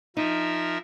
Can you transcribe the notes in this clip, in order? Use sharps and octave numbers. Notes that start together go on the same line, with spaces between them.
F3 D#4 A#4 E5